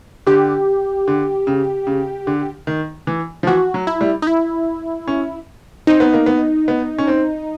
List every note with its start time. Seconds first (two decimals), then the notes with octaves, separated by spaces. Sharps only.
0.27 D3 G4
1.08 D3
1.47 C#3
1.87 C#3
2.27 D3
2.67 D#3
3.07 E3
3.43 F3
3.47 E3 F#4
3.74 F#3
3.87 E4
4.01 G3
4.22 D#4
4.27 E4
5.08 C#4
5.87 C4 D#4
6.00 B3
6.13 A#3
6.26 B3
6.68 B3
6.98 C#4
7.07 C4